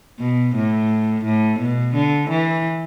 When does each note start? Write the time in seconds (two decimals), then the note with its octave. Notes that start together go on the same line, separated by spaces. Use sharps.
0.19 B2
0.55 A2
1.24 A2
1.59 B2
1.94 D3
2.29 E3